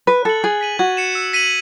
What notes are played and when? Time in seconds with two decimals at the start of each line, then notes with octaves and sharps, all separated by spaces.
0.07 B4 F#6
0.25 A4 A6 C#7 F#7
0.43 G#4 F#6
0.61 B6 D#7 F#7
0.79 F#4 G#6
0.97 C#7 E7
1.15 E6
1.33 B6 D#7 F#7